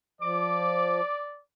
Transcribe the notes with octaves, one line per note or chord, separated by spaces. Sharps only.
F3 D5 D6